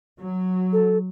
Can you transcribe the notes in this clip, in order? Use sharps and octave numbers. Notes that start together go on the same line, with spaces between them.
F#3
A4